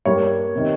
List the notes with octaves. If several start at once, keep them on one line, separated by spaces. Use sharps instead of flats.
G2 G3 A#3 C#5
C3 D#3